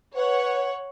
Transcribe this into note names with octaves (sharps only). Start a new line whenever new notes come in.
B4 C#5 F#5